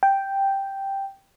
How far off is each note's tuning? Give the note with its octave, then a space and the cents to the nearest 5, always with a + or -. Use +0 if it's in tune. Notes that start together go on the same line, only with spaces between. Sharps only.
G5 +0